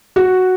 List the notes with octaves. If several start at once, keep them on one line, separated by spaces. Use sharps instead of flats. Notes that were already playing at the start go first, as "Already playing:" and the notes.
F#4